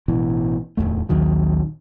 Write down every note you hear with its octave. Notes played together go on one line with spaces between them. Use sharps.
A1 B2 E3
D1 G#1 E2 A3
A#1 D#2 D#3 F#3